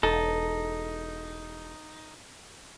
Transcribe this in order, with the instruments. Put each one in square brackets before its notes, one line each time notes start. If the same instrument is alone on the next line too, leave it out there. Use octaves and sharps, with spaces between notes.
[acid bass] E1 [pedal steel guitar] D#4 [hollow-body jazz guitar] A4